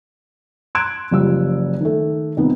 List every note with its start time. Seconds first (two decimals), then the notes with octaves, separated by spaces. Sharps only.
0.75 A#5 C6 F#6 G#6 D7 E7
1.11 F#1 F3 G3 E6
1.81 D#3 A3
2.37 C2 D#3 B3